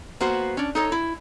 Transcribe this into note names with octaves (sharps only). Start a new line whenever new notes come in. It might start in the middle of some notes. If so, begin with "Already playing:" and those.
A#3 B3 F#4 C5
C#4 D4
D#4 A4 C#5
E4